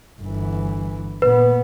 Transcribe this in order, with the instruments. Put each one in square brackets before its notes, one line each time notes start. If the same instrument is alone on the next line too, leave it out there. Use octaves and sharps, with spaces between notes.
[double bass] G1 E3
[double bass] A#2 B3 [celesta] B4